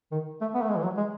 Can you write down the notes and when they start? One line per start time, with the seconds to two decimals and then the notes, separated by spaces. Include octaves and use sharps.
0.11 D#3
0.41 A3
0.54 B3
0.62 A3
0.69 G#3
0.76 E3
0.83 F#3
0.97 G#3